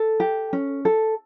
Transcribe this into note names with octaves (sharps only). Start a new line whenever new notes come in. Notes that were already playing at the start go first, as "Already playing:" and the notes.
Already playing: A4
G4
C#4
A4